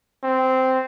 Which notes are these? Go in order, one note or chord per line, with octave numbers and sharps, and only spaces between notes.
C4